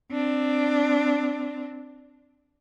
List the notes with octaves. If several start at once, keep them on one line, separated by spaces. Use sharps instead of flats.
C4 D4